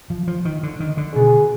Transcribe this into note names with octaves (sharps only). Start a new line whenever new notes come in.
F3
F3
D#3
D3
D#3
D3
B2 G#4